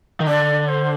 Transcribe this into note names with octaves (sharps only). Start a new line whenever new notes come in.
D#3
D3 D5
C5